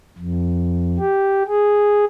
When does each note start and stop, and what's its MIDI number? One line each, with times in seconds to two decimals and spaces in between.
0.18 0.98 41
0.98 1.43 67
1.48 2.05 68